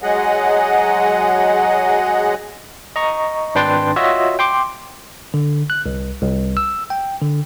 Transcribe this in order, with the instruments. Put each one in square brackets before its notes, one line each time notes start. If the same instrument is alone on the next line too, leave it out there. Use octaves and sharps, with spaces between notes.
[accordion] F#3 G#3 G#4 D#5 F#5
[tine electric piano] D#5 A#5 C#6
G#1 D4 B4 G5 C6 A6
F4 F#4 C#5 D#5 E5 E6
G5 C6 D6
D3
F#6
C2
C2
E6
G5
D3